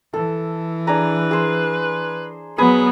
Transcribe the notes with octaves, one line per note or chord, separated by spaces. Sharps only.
E3 A4
D4 G#4 B4 A#5
G#4 C5
F#3 B3 G#4 B4